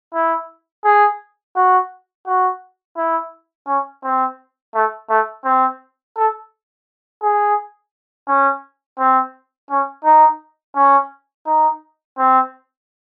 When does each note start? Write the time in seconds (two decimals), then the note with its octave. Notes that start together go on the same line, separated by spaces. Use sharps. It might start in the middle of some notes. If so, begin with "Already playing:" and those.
0.14 E4
0.85 G#4
1.56 F#4
2.27 F#4
2.97 E4
3.67 C#4
4.04 C4
4.75 A3
5.10 A3
5.45 C4
6.16 A4
7.23 G#4
8.28 C#4
8.99 C4
9.70 C#4
10.05 D#4
10.76 C#4
11.47 D#4
12.18 C4